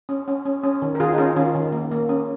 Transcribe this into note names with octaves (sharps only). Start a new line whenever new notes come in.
C#4
C#4
C#4
C#4
D#3
A#4
D#3 F4 G#4
D#4
C#4 F4
D#3 C#4 F4
D#3
A#3
A#3
C#4